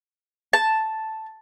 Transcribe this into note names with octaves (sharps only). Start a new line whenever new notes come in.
A5